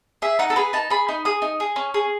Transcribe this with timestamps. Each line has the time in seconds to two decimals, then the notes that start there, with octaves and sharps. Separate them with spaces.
0.22 G#4 E5
0.39 D#4 F#5
0.50 A4
0.56 G#4 B4
0.73 D#4 A5
0.90 G#4 B5
1.08 D#4
1.25 G#4 D#6
1.42 D#4
1.60 G#4
1.76 C#4
1.94 G#4